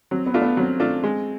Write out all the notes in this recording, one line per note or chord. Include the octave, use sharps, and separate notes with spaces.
F#3 C4
B3
A3 D4 F4
B3
F#3 C4
A3 D4 F4
G#3